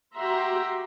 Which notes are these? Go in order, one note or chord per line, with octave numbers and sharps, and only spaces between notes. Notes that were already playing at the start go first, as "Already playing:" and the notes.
F#4 G4 E5 A#5 C6